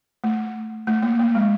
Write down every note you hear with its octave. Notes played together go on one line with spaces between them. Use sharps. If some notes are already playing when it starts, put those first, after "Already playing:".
A3
A3
A#3
A#3
G#3